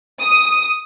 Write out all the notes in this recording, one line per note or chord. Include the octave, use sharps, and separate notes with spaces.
D#6